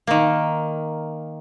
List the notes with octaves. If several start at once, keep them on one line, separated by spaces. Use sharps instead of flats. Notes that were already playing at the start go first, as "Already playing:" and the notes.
D#3 A#3